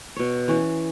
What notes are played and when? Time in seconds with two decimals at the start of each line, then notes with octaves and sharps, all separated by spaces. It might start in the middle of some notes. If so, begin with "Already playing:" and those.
0.16 B2 C#5
0.48 E3 C#4